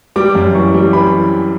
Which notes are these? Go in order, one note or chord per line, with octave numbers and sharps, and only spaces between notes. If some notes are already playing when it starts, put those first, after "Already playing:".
G3 D6
F#2
E3 C#6
G3
E3 B5